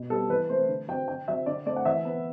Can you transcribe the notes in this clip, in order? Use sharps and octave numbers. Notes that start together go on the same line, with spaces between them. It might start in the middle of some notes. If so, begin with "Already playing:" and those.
Already playing: B2
G3 B3 A4
E3 B4
A3 C4 C5
D3
F#3 C4 G5
D3 G5
F#3 C4 E5
D3 D5
A3 C4 D5
F#5
E3 E5
B3